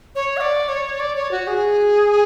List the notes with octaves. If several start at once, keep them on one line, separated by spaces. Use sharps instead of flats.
C#5
F#5
D5
C#5
D5
C#5
F#4
G#4